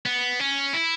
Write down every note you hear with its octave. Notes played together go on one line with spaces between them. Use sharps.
B3
C#4
E4